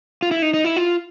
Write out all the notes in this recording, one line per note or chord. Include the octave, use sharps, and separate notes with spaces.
F4
E4
D#4
D#4
E4
F4